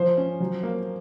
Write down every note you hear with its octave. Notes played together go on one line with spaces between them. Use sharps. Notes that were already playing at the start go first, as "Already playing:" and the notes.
Already playing: F3 C5
C#4
F#3
A#3